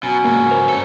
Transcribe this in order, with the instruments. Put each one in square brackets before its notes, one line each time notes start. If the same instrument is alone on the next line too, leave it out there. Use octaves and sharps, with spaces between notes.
[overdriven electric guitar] B2 [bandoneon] F#3 C#4
[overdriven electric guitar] C#2 G#2 [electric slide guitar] A#3
[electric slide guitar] A#4 C5
[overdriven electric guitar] G2 A4